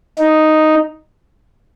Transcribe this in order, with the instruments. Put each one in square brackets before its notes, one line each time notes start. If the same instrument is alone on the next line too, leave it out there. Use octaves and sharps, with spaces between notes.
[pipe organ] D#4